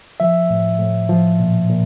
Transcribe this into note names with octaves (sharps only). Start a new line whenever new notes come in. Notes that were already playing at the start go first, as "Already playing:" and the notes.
F3 E5
A2
A2
F3
A#2
A#2